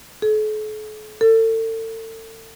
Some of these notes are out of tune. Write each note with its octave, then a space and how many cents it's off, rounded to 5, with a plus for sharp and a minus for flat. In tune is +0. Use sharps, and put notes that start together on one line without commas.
A4 -45
A4 +35